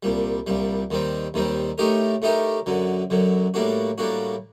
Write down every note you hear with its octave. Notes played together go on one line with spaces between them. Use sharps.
C2 A#2 G3
C2 A#2 G3
D#2 D#3 G3 C4
D#2 D#3 G3 C4
A2 A3 D#4 G4 A#4
A2 A3 D#4 G4 A#4
F#2 D3 F#3
F#2 D3 F#3
A2 G3 A#3 D4 F#4
A2 G3 A#3 D4 F#4